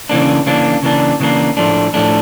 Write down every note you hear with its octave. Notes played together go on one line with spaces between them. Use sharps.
C#3 E3 A#3 D4
C#3 E3 A#3 D4
C#3 E3 A#3 D4
C#3 E3 A#3 D4
A2 F3 A3 D4
A2 F3 A3 D4